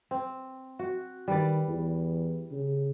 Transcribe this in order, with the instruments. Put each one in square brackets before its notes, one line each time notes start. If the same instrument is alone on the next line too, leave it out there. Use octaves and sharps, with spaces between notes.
[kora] C4
F#4
[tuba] D#3 [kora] G3 B4 D5
[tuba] E2
C#3